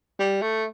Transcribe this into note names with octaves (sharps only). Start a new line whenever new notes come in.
G3
A3